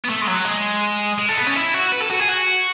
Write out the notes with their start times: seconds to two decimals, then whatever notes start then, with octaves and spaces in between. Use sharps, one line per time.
0.04 B3
0.08 A3
0.22 G#3
0.27 F#3
0.45 G#3
1.18 G#3
1.28 A3
1.37 B3
1.46 C#4
1.56 E4
1.74 F#4
1.92 B4
2.02 A4
2.11 F#4
2.20 G#4
2.29 F#4